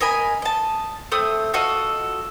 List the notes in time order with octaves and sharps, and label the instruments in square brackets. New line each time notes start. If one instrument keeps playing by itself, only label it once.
[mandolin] A#4 D#5 G#5 B5
D#5 A5
A3 C4 D#6
F4 F#4 A4 D#5